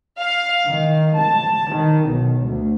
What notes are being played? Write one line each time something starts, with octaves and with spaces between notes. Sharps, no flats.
F5
D#3
A5
D#3
B1
D2